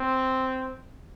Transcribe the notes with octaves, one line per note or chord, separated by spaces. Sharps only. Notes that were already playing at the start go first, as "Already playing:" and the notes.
Already playing: C4